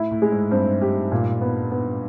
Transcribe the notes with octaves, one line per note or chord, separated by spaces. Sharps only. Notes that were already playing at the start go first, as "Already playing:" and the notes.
Already playing: A2 E4
A2
G#3
G#2
G2 C4
G4
A#2
B3
B3